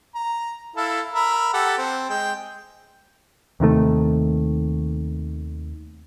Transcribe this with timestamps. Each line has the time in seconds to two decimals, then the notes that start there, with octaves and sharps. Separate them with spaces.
0.15 A#5
0.76 E4 A4 F5
1.14 A#4 E5 B5
1.53 G4 A4 F#5
1.78 C4
2.09 G#3 G5
3.60 D#2 C3 D#3 A3